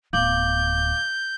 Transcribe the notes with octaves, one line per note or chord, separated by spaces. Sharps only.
D1 B3 F5 D6 G6 F#7